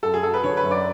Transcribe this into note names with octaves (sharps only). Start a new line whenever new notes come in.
F#2 A4
G#4
F#3 A4
B4
D3 C#5
B4
F#2
D5